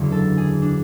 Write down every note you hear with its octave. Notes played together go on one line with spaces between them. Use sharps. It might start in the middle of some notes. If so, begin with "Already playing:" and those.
Already playing: F#1 E2 D3 F#3
A4
G#4
D4